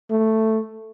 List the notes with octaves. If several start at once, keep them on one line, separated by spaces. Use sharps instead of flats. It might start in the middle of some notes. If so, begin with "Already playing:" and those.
A3